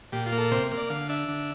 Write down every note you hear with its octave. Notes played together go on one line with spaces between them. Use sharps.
A#2 G4
F4
A#3
A4
C3 C5
A#3
D5
D3 F5
D4 E5
D3